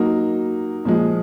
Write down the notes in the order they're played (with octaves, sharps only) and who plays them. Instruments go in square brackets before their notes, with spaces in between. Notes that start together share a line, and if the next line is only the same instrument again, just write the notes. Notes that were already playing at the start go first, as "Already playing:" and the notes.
Already playing: [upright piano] F#3 A#3 D#4
A#2 F3 G#3